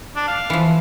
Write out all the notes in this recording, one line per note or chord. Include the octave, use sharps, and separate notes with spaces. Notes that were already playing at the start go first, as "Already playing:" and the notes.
D4
F5
E3 F3